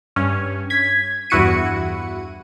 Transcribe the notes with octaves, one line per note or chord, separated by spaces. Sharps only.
G2 C#4
G#6 B6
E2 G2 E4 F#4 C#7 D#7